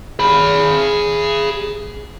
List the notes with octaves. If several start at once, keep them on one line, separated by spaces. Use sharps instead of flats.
G#4 B5